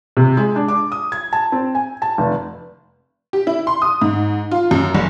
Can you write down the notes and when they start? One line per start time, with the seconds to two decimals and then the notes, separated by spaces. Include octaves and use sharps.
0.17 C3
0.37 G#3
0.56 D4
0.68 D6
0.92 D#6
1.12 G#6
1.33 A5
1.52 C4
1.75 G#5
2.02 A5
2.18 F1
3.33 G4
3.47 E4
3.67 C6
3.82 D#6
4.02 G#2
4.51 F4
4.71 F#2
4.94 F#1